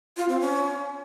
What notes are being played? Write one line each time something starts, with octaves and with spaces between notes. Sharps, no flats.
F4
C4
C#4